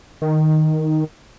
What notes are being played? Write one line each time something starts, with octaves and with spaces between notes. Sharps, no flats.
D#3